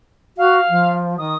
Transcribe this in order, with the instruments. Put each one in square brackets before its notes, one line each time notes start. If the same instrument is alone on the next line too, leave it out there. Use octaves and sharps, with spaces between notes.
[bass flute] F#4 [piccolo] F5
[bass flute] F3
[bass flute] D#3 [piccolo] D#6